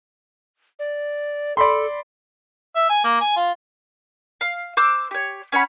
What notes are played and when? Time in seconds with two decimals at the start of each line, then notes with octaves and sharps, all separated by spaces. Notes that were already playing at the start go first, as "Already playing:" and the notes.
0.79 D5
1.57 A4 D5 B5 C6
2.76 E5
2.90 G#5
3.04 A#3
3.21 G#5
3.37 F4
4.41 F5
4.77 C5 D6 E6 F#6
5.11 G4 C#5
5.52 C#4 C#5 F#5 B5